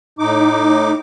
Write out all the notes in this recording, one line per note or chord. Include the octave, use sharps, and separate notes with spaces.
A2 D#4 D6